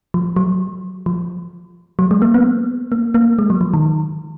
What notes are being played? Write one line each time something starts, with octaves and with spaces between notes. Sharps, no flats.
F3
F#3
F3
F#3
G#3
A#3
B3
A#3
A#3
G#3
F#3
F3
D#3